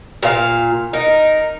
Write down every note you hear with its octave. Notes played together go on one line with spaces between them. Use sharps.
A#2 F5
D#4 A#4